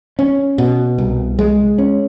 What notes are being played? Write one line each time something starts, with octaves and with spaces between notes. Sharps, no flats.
C#4
B2
C2
G#3
C#4